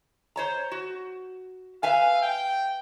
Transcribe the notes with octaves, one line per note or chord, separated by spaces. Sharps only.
C5 C#5 A#5
F#4
B4 E5 F5 G#5
G5